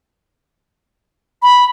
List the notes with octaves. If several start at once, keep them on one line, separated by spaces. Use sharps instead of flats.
B5